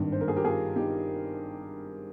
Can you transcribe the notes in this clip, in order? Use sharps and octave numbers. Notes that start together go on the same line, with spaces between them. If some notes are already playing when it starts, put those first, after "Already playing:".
Already playing: G#1 G2 D#3
C5
A#4
G#4
G4 A#4
F4 G#4
D#4 G4